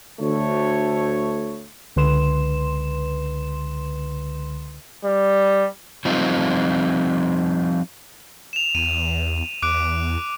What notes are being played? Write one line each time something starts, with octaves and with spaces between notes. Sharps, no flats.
D2 A3 C#5
C#2 D3 B4 C6 E7
G3
F3 G3 C4 D#4 F4
E7 F7
E2 D#7
E2 D6 F#6 D7